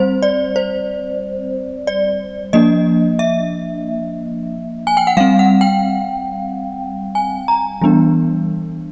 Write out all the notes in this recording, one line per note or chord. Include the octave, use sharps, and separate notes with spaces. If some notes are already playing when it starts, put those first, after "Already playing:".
Already playing: G3 C4 C5
D5
C5
D5
F3 A#3 D4 D#5
E5
G#5
G5
F#5
G3 C4 F5
F#5
G5
G#5
A#5
E3 G3 B3 D4